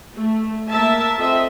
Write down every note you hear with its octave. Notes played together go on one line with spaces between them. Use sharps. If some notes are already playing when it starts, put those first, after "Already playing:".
A3
A#3 A#4 E5 A5
C4 F4 A4 D#5 E5